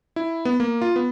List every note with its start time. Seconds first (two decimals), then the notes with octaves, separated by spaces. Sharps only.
0.16 E4
0.45 B3
0.60 A#3
0.82 F4
0.96 B3